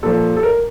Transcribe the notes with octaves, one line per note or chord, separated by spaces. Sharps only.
A#2 F3 A4
A4
A#4